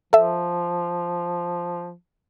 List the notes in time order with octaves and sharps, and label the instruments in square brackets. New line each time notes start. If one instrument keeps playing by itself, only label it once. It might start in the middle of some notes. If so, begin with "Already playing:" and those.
[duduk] F3 [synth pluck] A4 E5